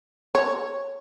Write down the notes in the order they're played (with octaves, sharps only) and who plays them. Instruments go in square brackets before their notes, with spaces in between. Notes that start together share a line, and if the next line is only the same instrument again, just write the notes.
[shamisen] C#5